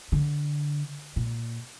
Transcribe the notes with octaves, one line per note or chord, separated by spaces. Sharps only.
D3
A#2